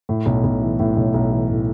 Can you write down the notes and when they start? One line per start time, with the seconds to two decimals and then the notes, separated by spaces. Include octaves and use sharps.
0.09 A2
0.26 B1
0.44 B1
0.62 E3
0.79 A2
0.96 B1
1.14 B1
1.32 E3
1.50 A2